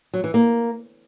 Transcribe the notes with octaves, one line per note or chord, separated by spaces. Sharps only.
F#3
E3
A#3